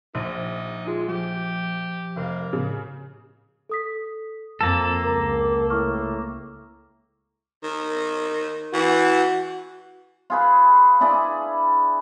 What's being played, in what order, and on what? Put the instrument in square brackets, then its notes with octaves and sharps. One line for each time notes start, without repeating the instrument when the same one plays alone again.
[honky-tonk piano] A#1 [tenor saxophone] D#4
[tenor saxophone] G#3 [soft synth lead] F4
[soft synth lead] F3 [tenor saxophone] G4
[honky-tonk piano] F1 [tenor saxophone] A#3
[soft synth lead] A2 [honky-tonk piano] C#3
[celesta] A4 D#6 B6
[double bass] F2 [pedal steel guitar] A#3 A4 [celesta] A5
[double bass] C#2 [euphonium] A#4 [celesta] A#5 D6
[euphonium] A2 [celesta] C#6 D6 F6
[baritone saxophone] D#3
[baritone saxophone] E3 [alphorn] F#4
[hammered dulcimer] F4 G#4 B4
D4 E4 G#4 D5